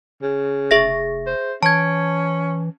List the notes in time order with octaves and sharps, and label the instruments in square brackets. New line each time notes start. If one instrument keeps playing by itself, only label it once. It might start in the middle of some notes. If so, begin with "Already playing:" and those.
[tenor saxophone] C#3
[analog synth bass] F1 [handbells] G#4 E5 A#6
[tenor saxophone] C5
[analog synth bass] E3 [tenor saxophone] C#4 [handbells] A5 G#6